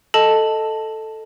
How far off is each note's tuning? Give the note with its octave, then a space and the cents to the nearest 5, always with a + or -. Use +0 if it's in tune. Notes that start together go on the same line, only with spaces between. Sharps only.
A4 +0 D#5 +0 A5 +0